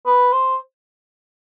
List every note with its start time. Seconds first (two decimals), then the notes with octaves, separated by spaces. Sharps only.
0.06 B4
0.32 C5